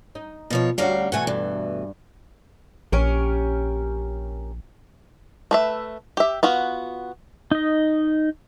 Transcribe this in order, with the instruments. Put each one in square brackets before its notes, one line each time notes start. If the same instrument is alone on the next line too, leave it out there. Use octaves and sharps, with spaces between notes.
[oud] D#4
[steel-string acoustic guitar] B2 F3 C#5
[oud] D2 C#4 F#4 [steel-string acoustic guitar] G3 F5 A#5
[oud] B2 E3 A3 [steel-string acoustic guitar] F#5 G#5
[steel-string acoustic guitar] G2
[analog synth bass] A#1 [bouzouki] C#4 G4 A#4
[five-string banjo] A3 B4 E5
G4 E5
B3 F4 F#4
[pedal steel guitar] D#4 D#5